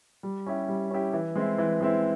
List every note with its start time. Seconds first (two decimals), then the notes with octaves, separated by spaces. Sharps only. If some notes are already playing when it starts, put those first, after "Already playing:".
0.23 G3
0.46 C#4 E4 G4
0.68 G3
0.90 C#4 E4 G4
1.14 E3
1.35 G#3 C4 E4
1.58 E3
1.81 G#3 C4 E4